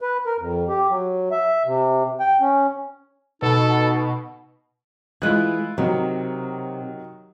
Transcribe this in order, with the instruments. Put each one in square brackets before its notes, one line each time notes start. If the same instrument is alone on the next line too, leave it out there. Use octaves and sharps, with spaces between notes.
[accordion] B4
A#4
F2
G4
F#3
E5
C3
G5
C#4
[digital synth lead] B2 [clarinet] D#4 [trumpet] A4
[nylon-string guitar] E3 G#3 [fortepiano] E4 F4 F#6
[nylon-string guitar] C3 [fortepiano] D#3 F#3